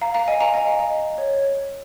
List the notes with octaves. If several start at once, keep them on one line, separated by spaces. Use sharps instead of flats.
F5 A#5
F5 A#5
D#5 G#5
F5 A#5
D#5 G#5
F5
D#5
C#5
C#5